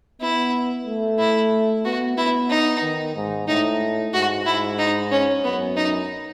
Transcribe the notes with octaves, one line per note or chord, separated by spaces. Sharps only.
B3 E4
A3
E4
B3 F#4
B3 E4
D#4
D#3
G#2
A2 D#4
G#2 F#4
G#2 E4
D#4
C#4
F#2 B3
D#4